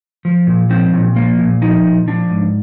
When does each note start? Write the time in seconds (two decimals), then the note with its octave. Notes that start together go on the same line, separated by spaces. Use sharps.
0.25 F3
0.47 A#2
0.70 F3 C4
0.93 A#2
1.16 F3 A#3
1.38 A#2
1.62 F3 D#4
1.85 A#2
2.07 F3 D4
2.30 G#2